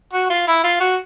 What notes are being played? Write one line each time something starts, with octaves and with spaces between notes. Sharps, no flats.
F#4
F4
E4
F4
F#4